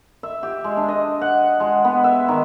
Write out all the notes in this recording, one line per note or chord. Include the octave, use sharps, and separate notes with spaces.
E5
G4
G#3
D4
D#5
F#5
G#3
B3
E5
D#3